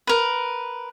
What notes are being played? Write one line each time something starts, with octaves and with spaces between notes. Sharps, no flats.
A#4 B4